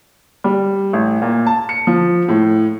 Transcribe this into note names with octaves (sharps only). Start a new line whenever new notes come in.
G3
A1
A#2
A5
C#7
F3
A2